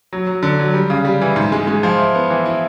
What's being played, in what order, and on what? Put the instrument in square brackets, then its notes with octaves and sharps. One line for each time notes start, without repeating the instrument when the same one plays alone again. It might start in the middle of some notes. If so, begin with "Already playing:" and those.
[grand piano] F#3
F#3
D3
F#3
G3
C#3
G3
E3
G#2
G#3
G#3
F3
E4
B3
E3
E4